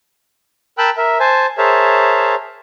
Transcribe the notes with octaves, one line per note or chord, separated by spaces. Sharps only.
A#4 G5 A5 B5 E6 F#6
A#4 E5
C5 G#5 A5
G#4 A#4 C5 C#5 E5 A5